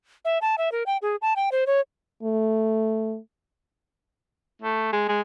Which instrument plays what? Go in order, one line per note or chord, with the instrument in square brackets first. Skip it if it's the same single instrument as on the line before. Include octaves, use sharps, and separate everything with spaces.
[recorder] E5
A5
E5
A#4
G5
G#4
A5
G5
C5
C#5
[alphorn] A3
[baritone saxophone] A3
G#3
G#3